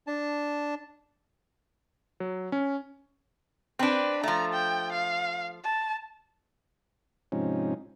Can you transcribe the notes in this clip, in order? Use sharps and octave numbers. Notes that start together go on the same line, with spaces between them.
D4 A5
F#3
C#4
C4 D4 B4
F3 A3 A#5
G5
F5
A5
G#2 C3 F3 C#4 D#4